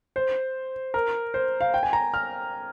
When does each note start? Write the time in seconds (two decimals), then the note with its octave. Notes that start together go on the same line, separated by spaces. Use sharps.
0.16 C5
0.94 A#4
1.34 C5
1.61 F5
1.74 G5
1.83 G#5
1.93 A#5
2.14 F6